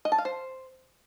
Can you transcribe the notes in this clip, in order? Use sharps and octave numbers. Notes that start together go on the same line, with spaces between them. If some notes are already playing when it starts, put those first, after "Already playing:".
D#5
A5
F5
C5